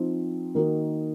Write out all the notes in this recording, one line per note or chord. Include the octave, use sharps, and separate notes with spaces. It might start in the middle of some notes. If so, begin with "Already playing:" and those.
Already playing: F3 C4 D#4
D#3 A#3 D#4 F#4